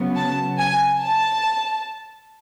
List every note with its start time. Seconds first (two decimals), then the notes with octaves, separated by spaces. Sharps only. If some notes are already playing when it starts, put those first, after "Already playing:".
Already playing: C#3 F#3 B3
0.16 A5
0.59 G#5
1.01 A5